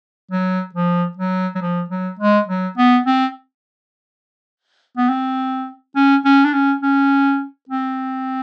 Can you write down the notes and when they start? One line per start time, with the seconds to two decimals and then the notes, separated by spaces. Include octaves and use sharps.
0.31 F#3
0.74 F3
1.17 F#3
1.55 F#3
1.62 F3
1.90 F#3
2.19 G#3
2.48 F#3
2.78 B3
3.06 C4
4.97 B3
5.09 C4
5.96 C#4
6.25 C#4
6.45 D4
6.53 C#4
6.83 C#4
7.69 C4